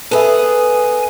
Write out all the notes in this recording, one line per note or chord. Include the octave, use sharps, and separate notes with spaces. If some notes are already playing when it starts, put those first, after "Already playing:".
B3 G#4 A4 B4 E5 G#5